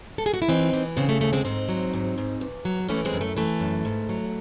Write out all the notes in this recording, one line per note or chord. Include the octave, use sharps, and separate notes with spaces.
A4
G#4
F#4
E4
E3 C4 D#4
E3
C#3 G#3 C4
A3
D#2 A3
G#3 C4
G#2 C4 D#4
F#3
G#2
G#2
E2
F#3
E3 A3 C#4
G#3 C4
F#2
A3
E3 A3
F#2
G#2
F#3